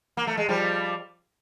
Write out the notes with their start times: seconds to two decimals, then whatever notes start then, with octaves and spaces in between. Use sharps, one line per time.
0.17 A#3
0.27 A3
0.37 G#3
0.49 F3 G3